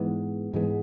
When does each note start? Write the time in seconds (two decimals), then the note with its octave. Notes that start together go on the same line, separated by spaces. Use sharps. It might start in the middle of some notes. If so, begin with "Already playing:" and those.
Already playing: G#2 E3 G#3 B3
0.53 G#2 E3 G#3 B3